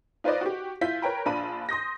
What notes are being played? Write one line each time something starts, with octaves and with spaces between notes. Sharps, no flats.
D#4 F4 B4 C5 D5 D#5
F#4 G4
E4 F4 G6 B6
A#4 B4 C#5 G5 A#5 B5
A#1 D4 F4 B5 D#7
C6 D#6 G6 A#6